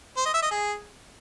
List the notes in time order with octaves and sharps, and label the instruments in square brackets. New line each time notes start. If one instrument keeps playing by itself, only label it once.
[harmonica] C5
D#5
E5
D#5
G#4